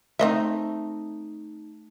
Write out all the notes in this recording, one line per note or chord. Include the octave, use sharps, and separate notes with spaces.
A3 C4 D#4 D#5 E5